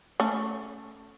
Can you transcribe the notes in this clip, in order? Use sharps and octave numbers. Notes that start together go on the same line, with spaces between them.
A3 C#4